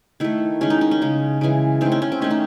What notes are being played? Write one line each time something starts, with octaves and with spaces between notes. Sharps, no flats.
D#3 A3 E4
D#3 G#3 C#4
D#4
D#4
C#4
C#3 G#3
C#3 E3 G#3
D#3 A3 C4
C#4
C#4
C4
D#3 A3 C#4
D#4